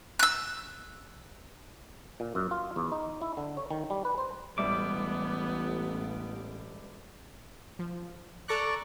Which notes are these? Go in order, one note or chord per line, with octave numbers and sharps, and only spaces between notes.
E6 F#6
A#2
F#2
F4
E2
D#4
E4
D3
C#5
D#3
G3
B4
C5
E1 A1 G3 B3 E5 D6
F3
A4 D5 A#5 C#6 F#6